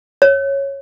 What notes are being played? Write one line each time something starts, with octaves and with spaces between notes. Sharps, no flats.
C#5